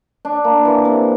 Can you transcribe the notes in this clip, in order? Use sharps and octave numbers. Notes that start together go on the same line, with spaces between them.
D4
A#3
E3
C3